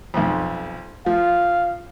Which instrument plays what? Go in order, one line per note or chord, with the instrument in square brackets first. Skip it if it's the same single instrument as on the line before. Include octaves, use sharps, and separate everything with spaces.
[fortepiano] B1 F2
[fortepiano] F3 [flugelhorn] F5